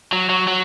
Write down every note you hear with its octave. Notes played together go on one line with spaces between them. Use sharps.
F#3
F#3
F#3